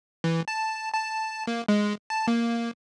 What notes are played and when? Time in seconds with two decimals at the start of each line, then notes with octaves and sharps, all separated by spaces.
0.24 E3
0.48 A5
0.94 A5
1.47 A#3
1.68 G#3
2.10 A5
2.27 A#3